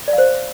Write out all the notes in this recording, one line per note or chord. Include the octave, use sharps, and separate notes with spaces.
D5
F5
C5